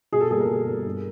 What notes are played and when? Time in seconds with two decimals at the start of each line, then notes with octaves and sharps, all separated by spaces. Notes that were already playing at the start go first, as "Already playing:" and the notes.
0.13 B2 G#4
0.21 A4
0.31 G3 A#3 G#4
0.40 A#4
0.49 B2
0.67 G3 A#3
0.85 G2